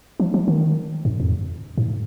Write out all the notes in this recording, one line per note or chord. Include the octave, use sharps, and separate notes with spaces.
F3
F3
D#3
G2
F2
G#2